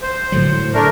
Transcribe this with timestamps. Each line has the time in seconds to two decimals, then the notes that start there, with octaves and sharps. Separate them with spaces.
0.02 C5
0.32 A2 D3 F#3
0.74 A3 D4 A#4